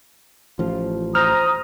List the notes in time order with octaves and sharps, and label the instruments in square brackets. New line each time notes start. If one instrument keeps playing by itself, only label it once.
[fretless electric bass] A1 F3 [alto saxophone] F4
[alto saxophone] C5 [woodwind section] A#5 D#6 [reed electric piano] F6